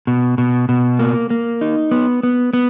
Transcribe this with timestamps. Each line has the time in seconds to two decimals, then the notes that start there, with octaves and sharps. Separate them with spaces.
0.07 B2
0.38 B2
0.69 B2
0.99 A#3
1.30 A#3
1.61 D#4
1.91 B3
2.23 B3
2.53 B3